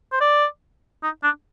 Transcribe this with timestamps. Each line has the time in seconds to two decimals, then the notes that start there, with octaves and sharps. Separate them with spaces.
0.12 C5
0.21 D5
1.03 D#4
1.23 D4